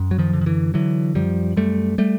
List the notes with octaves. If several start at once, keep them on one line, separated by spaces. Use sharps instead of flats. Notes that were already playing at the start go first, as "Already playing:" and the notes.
Already playing: F#2
F#3
D#3 F3
D3
D#3
D3 E3
D3 E3 F#3
F#2 F3 G3
F#2 G3 A3
G3 A3